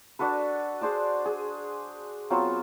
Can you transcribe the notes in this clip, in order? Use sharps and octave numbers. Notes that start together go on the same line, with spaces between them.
D4 F#4 A4 B4
G#4 C5 D5 A5
G#4
F#3 B3 C4 F4